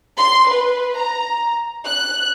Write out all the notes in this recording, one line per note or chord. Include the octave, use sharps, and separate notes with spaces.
C6
B4
A#5
F#6